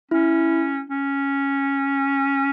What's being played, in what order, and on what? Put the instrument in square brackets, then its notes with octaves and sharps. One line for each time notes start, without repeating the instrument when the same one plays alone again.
[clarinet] C#4 [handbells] E4
[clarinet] C#4